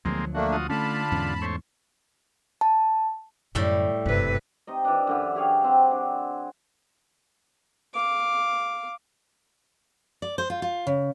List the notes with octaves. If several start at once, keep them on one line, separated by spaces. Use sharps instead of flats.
D2 F3 F#3 G#3 A#3 C4
A3 A#3 D4 F#4
F4 F#4 D#6
D3 A3 C#4 F4 A5 B5
E2 G#2 C#4
A3 C5 C#5
A5
F#2 A2 D3 G3 G4
F#1 G2 C3 B4
C3 D#4 D#5
E3 D4
F#2 D3 E3
G4 G#4 C#5 F5
C3 F#3 C4
D4
F5 D6
D5
C5
F4
F4
C#3